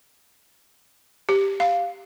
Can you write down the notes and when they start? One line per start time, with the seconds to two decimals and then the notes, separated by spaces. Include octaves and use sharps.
1.29 G4
1.60 F5